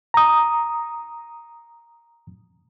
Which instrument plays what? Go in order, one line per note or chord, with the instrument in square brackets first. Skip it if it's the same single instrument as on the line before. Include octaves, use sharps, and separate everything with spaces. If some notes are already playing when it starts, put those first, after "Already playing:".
[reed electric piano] A#5 D#6